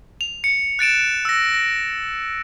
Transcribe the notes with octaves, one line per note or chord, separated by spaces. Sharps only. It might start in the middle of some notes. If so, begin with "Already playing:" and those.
F7
C#7
F#6 A6 D7 E7
E6 A#6
A#6